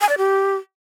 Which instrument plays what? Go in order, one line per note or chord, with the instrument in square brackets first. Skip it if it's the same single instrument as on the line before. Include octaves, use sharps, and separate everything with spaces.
[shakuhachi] G#5
D5
G4